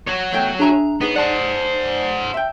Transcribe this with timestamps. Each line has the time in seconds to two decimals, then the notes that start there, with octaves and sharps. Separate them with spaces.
0.07 F#4 C#5
0.33 E2 A3 G5
0.59 D4 G#4 E5 G#5 A#5
1.01 B3 D#4 G#4 C#5
1.16 C5 D5 F#5 A5
2.34 E5 G5